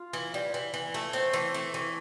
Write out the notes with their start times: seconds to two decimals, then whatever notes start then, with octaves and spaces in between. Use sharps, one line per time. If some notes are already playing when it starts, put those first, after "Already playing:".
Already playing: F4
0.13 E3
0.34 G3
0.54 E3
0.74 E3
0.94 A3
1.13 C4
1.33 E3
1.54 A3
1.74 E3